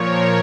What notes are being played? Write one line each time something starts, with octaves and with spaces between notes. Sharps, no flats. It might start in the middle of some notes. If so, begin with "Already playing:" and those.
Already playing: A#2 F3 A#4 C#5